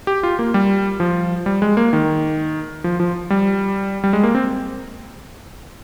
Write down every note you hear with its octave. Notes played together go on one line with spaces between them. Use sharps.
G4
F4
A#3
G3
F3
G3
G#3
A#3
D#3
F3
F3
G3
G3
G#3
A#3
C4